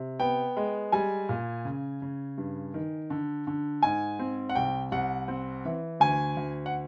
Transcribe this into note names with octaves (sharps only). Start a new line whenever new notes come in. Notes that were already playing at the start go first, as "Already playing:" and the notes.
Already playing: C3
B3 G5
G#3
G3 G#5
A#2
C#3
C#3
G2
D#3
D3
D3
G#2 G#5
C4
F#5
C2 G5
C2 F#5
C4
E3
D2 G#5
D2
F#5